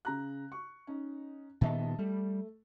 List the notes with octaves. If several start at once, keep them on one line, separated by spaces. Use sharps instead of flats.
C#3 A#5 F#6
C#6
C#4 D#4
A#2 D#3 B3 D#5 E5 A5
G3 A3